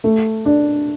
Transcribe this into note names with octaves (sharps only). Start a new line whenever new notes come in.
A3
D4